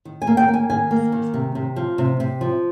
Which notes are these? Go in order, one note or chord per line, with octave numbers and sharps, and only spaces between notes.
D#3
G#5
A#3
G5
A#3
G#5
D#3 G#5
A#3
D#3
C3
C3
F3
C3
C3
F3